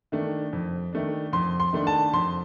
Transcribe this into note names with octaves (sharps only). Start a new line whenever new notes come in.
D#3 A3 D4
F2
D#3 A3 D4
F2 C6
C6
D#3 A3 D4
A5
F2 C6